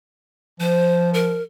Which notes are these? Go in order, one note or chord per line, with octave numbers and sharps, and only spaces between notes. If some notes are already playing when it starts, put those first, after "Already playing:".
F3 C5
A#4